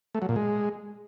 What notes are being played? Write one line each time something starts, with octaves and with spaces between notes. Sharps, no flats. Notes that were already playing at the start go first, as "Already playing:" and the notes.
A3
F#3
A#2
G#3